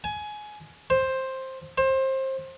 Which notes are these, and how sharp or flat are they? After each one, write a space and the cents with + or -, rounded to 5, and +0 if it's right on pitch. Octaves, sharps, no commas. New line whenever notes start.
G#5 +20
C5 +10
C5 +25